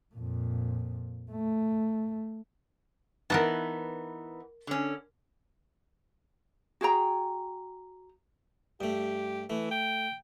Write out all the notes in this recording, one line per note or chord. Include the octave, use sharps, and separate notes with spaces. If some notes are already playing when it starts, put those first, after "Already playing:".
F2 A#2
A3
E3 B3 D#4 A#4 F#5 A5
D3 C#4
F#4 G#4 G5 A#5
G2 A3 G4
E3 A3
G5